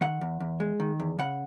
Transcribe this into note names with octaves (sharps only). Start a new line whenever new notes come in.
D#3 F#5
E2
E2
G#3
D#3
E2
C#3 F#5